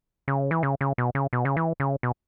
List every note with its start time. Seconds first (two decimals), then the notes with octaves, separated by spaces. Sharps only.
0.28 C#3
0.51 E3
0.63 C#3
0.81 C#3
0.98 B2
1.15 C#3
1.33 B2
1.45 C#3
1.57 E3
1.80 C#3
2.03 B2